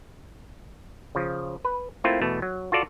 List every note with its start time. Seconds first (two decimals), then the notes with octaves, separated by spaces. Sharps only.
1.15 C#3 F3
1.65 B4
2.04 A3 A#3 C4 E4 F4
2.21 E2 B2 A3
2.42 F#3
2.72 F4 F#4 A4 D5 F5